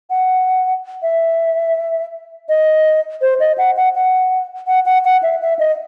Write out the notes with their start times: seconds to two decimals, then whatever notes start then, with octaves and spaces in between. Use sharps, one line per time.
0.10 F#5
1.02 E5
2.49 D#5
3.21 C5
3.40 D#5
3.58 F#5
3.76 F#5
3.95 F#5
4.67 F#5
4.85 F#5
5.04 F#5
5.23 E5
5.41 E5
5.59 D#5